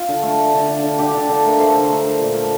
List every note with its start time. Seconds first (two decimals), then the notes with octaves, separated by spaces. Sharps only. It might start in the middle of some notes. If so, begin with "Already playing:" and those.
Already playing: F4
0.08 D3
0.22 A3
0.38 A3
0.53 D3
0.68 D3
0.83 D3
0.98 D3 G4
1.15 D3 A4
1.29 D3 A4
1.44 A3 A#4
1.60 A3 C5
1.75 D3
1.90 A3 A#4
2.06 D3
2.20 A#2
2.36 A3